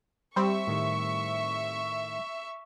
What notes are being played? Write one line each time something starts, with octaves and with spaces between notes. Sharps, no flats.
G3 C4 E5 C#6
A2 D#3